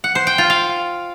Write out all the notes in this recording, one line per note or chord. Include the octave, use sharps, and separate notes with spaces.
F#5
C5
G5
F4
F5